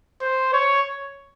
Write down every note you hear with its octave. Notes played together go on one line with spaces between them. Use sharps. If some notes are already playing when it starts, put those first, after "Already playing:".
C5
C#5